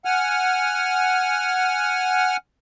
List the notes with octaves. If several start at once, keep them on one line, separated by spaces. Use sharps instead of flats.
F#5 G#5 F6